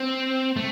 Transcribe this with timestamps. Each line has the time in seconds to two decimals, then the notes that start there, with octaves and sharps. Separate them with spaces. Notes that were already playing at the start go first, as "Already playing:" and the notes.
Already playing: C4
0.56 A3